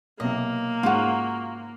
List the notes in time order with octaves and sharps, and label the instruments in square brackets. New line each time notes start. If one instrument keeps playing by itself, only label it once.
[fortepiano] B1 C3 [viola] A#3 [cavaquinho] D#5
[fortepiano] G#2 C#3 F#5 [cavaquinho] F4 F#4